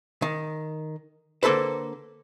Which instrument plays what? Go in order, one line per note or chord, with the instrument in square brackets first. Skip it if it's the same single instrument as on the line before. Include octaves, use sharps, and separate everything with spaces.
[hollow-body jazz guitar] D#3
D3 A#3 A4 B4 C5